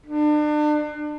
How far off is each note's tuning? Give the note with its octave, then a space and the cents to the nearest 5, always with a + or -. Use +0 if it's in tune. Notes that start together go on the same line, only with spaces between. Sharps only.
D4 +35